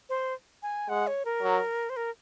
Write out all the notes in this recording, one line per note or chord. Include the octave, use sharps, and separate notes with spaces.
C5
G#5
G#3 F#5
C#5
A#4
F#3
C5
A#4